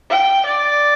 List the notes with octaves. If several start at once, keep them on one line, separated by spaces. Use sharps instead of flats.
G5
D5